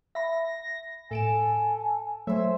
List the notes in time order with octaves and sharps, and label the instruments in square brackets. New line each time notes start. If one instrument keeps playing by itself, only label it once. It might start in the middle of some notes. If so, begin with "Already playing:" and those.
[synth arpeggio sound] E5 B5 [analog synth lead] A#6
[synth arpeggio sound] A2 D7 E7 [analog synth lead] A4 [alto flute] G#5
[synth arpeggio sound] F#3 A3 C#5 [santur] A4 C5 G#5 [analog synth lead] E5